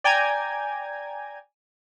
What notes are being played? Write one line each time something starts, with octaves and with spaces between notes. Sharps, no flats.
D5 G5 G#5 A#5 G#6